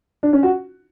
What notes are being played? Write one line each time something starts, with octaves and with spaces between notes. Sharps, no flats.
D4
C#4
F#4